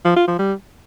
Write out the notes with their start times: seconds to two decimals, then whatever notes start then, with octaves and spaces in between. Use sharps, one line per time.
0.05 F3
0.16 F4
0.28 F3
0.39 G3